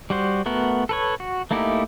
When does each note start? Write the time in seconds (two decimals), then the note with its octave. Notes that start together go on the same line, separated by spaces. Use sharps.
0.10 G3 F#4 C5
0.46 A3 B3 F#4 A#4
0.89 A4 B4 C#5
1.20 F#4
1.51 A3 A#3 D#4 E4 G4